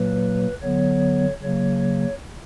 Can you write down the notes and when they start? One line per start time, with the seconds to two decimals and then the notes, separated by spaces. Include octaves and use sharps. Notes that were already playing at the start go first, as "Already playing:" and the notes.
Already playing: A#2 F#3 A#3 B4
0.62 D3 F#3 B3 C#5
1.42 C#3 F#3 A#3 C#5